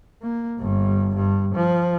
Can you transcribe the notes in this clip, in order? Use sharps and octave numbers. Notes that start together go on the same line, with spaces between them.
A#3
G1 G2
G2
F3